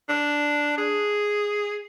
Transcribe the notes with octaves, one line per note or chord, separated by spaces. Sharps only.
D4
G#4